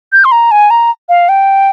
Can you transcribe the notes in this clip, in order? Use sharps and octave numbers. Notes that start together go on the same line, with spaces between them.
G6
C6
A#5
G#5
A#5
F5
G5